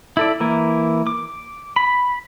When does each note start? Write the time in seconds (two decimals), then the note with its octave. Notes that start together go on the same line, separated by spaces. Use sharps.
0.17 E4 A4 D5
0.40 E3 A#3 E4
1.07 D6
1.76 B5